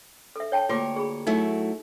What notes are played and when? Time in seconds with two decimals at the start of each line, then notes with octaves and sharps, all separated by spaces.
0.36 A4 E5
0.52 C#5 G5 A5
0.69 D2 A#3 F4 G4 C#5 D6
0.96 G#4 B5
1.27 F#3 A3 D#4 E4